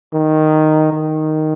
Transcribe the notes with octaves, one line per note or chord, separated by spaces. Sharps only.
D#3
D#3